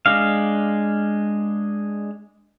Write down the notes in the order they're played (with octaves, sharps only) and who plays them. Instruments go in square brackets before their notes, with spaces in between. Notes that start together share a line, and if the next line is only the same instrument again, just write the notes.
[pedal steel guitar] G#3 D4 F5